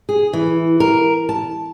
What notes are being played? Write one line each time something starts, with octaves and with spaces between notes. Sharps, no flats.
G#4
E3
A#4
A5